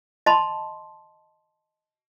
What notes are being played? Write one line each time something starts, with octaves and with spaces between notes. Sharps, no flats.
D#5 A5 B5 C6